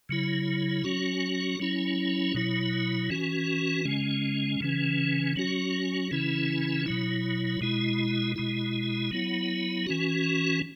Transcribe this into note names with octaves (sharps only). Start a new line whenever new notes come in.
C#3 F#3 E4
F#3 C#4 F#4
F#3 C#4 E4
B2 F#3 E4
E3 C#4 F#4
C#3 G#3 C#4
C#3 E3 C#4
F#3 C#4 F#4
C#3 E3 C#4 E4
B2 F#3 E4
B2 G#3 E4
B2 G#3 E4
F#3 B3 E4
E3 C#4 F#4